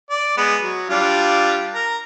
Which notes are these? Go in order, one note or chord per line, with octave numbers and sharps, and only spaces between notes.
D5
G#3 B3
F#3
G3 D4 F4
A#4 A#5